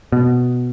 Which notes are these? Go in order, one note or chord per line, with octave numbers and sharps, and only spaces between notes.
B2